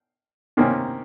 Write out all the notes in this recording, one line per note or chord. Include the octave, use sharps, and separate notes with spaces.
C3 D#3 A#3 C#4